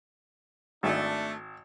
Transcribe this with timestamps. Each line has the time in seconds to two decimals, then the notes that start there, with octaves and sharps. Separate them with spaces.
0.83 G#1 A3 D4